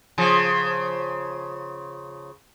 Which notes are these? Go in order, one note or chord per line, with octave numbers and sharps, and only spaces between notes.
C#3 F3